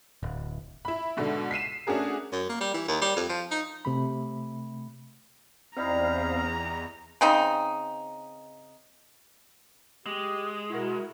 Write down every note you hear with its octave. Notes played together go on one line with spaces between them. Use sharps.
D1
E4 B5
G#2 B2 D3
B6 C7 D#7 E7
A3 C#4 D4 F#4 G#4 A#4
F#2
A#3
G3
E3
D#2
G3
F2
F3
D#4
C3 A3 B5
E2 G3 C4 D#4 E4 F5 A#5
C#3 C4 D#4
G#3 G4
B2 E4 F#4 A#4